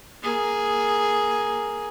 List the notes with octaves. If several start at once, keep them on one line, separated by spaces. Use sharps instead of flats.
A#3 G#4